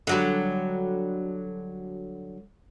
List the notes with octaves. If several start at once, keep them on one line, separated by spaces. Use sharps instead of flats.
D3 F#3 G3